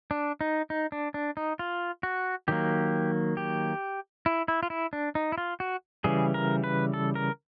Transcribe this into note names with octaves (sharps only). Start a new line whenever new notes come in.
D4
D#4
D#4
D4
D4
D#4
F4
F#4
D#3 F#3 A#3 G4
G4
E4
E4
F4
E4
D4
D#4
E4
F4
F#4
C#3 E3 G3 G#4
A#4
B4
A4
A#4